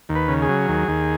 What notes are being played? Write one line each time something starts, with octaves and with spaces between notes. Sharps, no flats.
D#2
B4
C#3
G#4
F#3
D#2
D#2